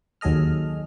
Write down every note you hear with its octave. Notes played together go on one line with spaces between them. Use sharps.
D#2 F#3 G#4 A4 D#5 F6